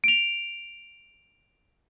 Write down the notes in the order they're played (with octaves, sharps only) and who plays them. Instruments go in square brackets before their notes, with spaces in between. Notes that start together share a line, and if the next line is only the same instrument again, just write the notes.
[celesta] D7 F7